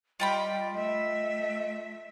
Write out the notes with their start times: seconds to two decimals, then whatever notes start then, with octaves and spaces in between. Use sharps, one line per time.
0.20 G3 F4 D#5 G5 B5
0.75 A3 D#5 E5